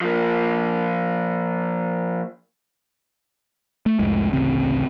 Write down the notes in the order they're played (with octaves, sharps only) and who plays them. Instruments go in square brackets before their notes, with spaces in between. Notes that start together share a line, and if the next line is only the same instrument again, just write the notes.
[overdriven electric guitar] F3 A#3
[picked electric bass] A3
C2 F2 A2 G#3
A1 D2 C#3 C4